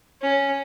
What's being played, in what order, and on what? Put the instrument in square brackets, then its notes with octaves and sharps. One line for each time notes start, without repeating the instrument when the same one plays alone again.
[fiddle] C#4